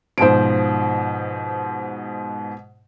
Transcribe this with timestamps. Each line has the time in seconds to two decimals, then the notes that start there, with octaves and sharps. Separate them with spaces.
0.18 G#2 B2 F3 C5 D7